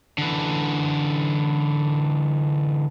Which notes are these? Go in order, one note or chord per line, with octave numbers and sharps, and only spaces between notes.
D3 E3